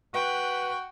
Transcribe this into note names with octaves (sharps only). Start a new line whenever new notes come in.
F#4 B4 G5